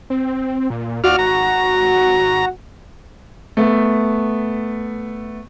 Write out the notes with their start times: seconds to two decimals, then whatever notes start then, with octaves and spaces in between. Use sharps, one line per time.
0.10 C4
0.70 A#2
1.04 D#2 F4 F#4 D5 F6
1.19 G#1 A#5
3.57 A3 B3